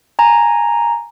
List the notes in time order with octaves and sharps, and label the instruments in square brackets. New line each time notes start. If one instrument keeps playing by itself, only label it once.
[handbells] G#5 A#5